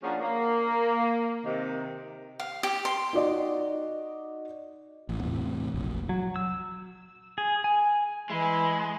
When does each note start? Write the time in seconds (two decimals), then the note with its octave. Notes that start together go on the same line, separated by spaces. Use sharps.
0.03 F3 A#3 C#4 D4 F#4 G#4
0.21 A#3
1.45 C3 D#3
2.40 F5
2.63 G4
2.85 C6
3.13 D#4 F#4 D5 D#5
5.09 A1
5.23 E2 A2 C3
5.74 F1 A#1
6.09 F#3
6.36 E6
7.38 G#4
7.64 G#5
8.30 E3 G#3 E4